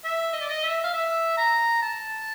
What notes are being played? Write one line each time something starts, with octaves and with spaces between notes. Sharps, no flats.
E5
D#5
D5
D#5
E5
F5
E5
A#5
A5